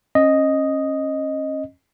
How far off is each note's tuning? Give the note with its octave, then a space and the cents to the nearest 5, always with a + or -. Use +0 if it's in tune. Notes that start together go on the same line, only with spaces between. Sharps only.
C#4 -35 D#5 +0